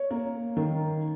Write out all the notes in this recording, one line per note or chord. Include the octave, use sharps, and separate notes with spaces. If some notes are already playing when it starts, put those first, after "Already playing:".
Already playing: C#5
A#3
D#3